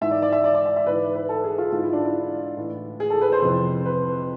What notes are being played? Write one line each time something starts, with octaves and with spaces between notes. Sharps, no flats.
G#2 E3 E5
D5
D5
E5
D5
D5
E5
E5
G#2 E3 B4
B4
A4
G#4
F4
G#2 E3 F4
E4
D4
E4
A2 E3
G#4
A4
B4
C5
F2 C3 E3
B4